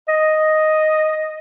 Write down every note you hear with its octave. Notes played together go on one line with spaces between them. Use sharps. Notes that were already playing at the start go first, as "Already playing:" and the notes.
D#5